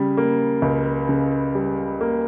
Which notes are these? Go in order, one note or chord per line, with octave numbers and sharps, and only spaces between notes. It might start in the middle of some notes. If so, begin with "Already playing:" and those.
Already playing: C#3 G3
A#3
C#2
C#3
G3
A#3